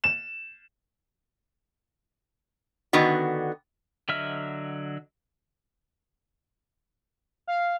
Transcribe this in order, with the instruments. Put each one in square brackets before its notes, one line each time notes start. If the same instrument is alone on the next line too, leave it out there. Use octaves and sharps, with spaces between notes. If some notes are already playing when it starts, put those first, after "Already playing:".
[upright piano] E7
[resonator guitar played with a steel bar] D3 D#3 B3 F#4
[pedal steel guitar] D3 F#3 D#5 E5 F6
[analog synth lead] F5